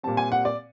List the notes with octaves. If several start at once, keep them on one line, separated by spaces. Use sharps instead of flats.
A#2 G3 C4 A5
G#5
F#5
D5